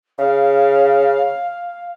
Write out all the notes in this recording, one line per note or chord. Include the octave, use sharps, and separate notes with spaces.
C#3 F5